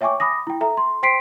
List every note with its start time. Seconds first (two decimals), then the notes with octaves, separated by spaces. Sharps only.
0.01 C#5 E5 G5 G#5 C#6 D6
0.20 B5 D6 D#6 A#6
0.47 E4 G5
0.61 A4 E5 A#5
0.77 C6
1.03 C5 G5 C6 B6 C7 D7